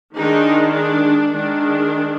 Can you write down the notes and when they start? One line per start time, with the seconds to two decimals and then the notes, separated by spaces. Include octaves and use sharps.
0.15 D#3 G#3 D4 D#4
0.73 D4
1.31 D#3 G#3 D4